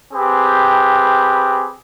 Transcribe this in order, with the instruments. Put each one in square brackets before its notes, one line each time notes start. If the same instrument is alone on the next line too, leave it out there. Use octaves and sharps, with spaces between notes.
[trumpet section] C4 G4 G#4 B4